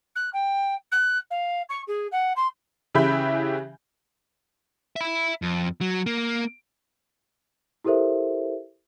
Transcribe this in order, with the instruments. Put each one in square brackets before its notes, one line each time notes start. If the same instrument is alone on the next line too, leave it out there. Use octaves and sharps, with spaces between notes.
[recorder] F#6
G5
F#6
F5
C#6
G#4
F#5
C6
[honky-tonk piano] C#3 E3 G4 E5 B5 G6
[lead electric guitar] E5 B5
F2
F#3
A#3
[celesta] E4 G4 A4 A#4 C5 E5